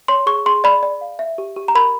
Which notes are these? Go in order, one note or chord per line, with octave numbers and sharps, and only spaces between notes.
C#5 C6
G#4 C#6
G#4 C6
D5 B5
D5
F5
E5
G4
G4
A#5
A#4 B5